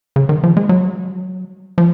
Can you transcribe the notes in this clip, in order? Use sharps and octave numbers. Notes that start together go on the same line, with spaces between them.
C#3
D#3
F3
G#3
F#3
F3